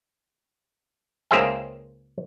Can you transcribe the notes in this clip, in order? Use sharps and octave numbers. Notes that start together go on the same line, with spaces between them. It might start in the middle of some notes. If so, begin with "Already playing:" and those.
C#2 A#3 G#4 C5 E5 G5